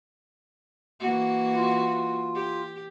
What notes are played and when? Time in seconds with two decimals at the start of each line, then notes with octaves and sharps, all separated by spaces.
1.00 E3 A#3 F#4
1.55 F4
2.35 G4